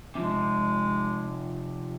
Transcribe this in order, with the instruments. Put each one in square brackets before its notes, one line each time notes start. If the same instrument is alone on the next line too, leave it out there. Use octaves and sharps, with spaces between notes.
[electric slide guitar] C3 F3 [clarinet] G#3